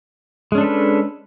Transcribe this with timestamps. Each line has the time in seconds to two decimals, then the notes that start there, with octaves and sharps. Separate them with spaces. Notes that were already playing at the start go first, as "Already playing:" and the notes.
0.52 G#3
0.55 C#4
0.58 D4
0.61 A4
0.64 B4